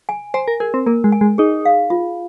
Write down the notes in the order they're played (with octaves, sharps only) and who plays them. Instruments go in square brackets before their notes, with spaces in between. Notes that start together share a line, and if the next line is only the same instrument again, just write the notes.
[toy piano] G#5
[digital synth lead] C5 [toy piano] G#5
[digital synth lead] A#4
[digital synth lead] G#4 [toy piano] A#4
[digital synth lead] C4
[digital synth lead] A#3 [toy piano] A#4
[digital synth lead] G#3
[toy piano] G#5
[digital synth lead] G#3
[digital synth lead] D#4 [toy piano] G#4
[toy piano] F5
F4